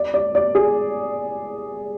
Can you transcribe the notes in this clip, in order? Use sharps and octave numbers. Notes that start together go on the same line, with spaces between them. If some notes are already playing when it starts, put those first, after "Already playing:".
Already playing: D5
D5
D5
G#4